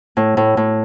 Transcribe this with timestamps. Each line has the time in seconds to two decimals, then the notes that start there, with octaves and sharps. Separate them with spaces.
0.17 A2
0.37 A2
0.57 A2